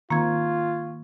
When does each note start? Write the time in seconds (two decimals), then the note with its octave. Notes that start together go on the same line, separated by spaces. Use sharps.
0.10 D#3 A#3 C4 F4 C#6 G#6